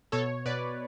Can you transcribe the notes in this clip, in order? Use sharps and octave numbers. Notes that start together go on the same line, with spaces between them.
B2 A4 C#5
B2 B4 D5